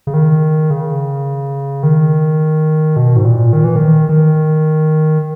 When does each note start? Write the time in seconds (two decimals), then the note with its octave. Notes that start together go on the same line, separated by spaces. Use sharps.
0.07 C#3
0.14 D#3
0.70 C#3
1.83 D#3
2.96 B2
3.16 G#2
3.25 A#2
3.53 D#3
3.64 E3
3.76 D#3
4.09 D#3